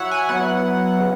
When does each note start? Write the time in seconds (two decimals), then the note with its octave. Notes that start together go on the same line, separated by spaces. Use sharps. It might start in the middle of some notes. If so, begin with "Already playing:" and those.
Already playing: F#3 E4 C#5 E5 F#5
0.11 G#5
0.29 F#3 B3 E4 F#5
0.99 C#3